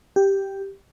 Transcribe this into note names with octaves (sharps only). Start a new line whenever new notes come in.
G4